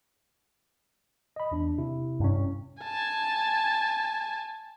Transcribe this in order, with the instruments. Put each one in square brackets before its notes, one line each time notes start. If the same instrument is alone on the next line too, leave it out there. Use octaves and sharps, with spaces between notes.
[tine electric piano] D#5 B5
E2 D4
C3 E4
[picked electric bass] G2 C#4
[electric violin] G#5 A5